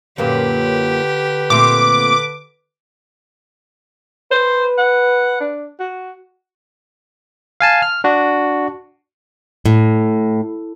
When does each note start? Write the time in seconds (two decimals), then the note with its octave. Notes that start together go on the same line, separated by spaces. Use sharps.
0.18 F#2 A#2 D3 A#3 G4 B4
1.50 A#2 A3 C4 D6
4.31 B4 C5
4.78 F#5
5.40 D4
5.80 F#4
7.60 F5 G#5 A5
7.82 F6
8.04 D4 F#4
9.66 A2